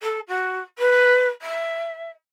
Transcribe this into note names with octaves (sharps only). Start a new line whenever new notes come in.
A4
F#4
B4
E5